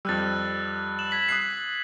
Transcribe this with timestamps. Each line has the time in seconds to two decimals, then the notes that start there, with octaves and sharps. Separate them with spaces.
0.05 F2 G3 E6 F#6 A6
0.99 E7 F#7
1.11 G#6 B6 F#7
1.29 D#6 F#6 C7